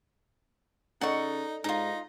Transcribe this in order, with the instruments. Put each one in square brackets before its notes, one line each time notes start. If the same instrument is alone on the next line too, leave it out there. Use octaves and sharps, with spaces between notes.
[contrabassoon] C#3 [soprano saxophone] D#4 [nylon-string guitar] A4 D5 D#5 [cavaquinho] F#5 C#6
[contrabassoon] G#2 [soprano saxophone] D#4 [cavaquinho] F4 A#5